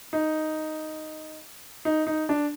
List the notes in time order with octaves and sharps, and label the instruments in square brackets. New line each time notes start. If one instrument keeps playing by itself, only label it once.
[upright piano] D#4
D#4
D#4
D4